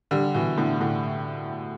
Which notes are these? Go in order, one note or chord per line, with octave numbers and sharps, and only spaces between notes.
D3 G3
B2 E3
A2 D3
A2 D3